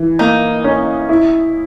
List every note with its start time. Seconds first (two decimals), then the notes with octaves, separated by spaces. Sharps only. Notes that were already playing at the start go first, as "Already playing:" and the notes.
Already playing: E3
0.19 A#3 D#4
0.64 C#4
1.09 E4